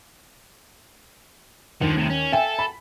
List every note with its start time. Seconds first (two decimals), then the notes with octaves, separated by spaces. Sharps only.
1.81 D#2 D3 F3
1.96 A2 C3
2.10 C#4
2.32 A4 E5 G5 G#5
2.59 B5